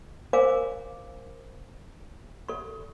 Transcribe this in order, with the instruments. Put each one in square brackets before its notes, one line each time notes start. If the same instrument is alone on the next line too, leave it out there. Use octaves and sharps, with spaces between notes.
[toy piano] A#4 C5 F5 G#5 D6
A4 C#6